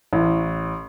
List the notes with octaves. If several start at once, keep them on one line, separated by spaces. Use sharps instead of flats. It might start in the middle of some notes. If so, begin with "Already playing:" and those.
A1